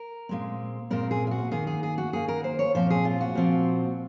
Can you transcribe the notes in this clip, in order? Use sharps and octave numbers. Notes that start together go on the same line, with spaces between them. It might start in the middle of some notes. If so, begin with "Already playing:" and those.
Already playing: A#4
A#2 G#3 C4
A#2 G#3 C4 A#4
G#4
F4
F#4
D#3 A#3 G#4
G#4
G#4
F#4
D#3 A#3 G#4
A#4
C5
C#5
A#2 F3 C4 C5
G#4
F4
F#4
A#2 F3 C4